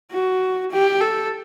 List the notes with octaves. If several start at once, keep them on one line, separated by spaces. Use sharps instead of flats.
F#4
G4
A4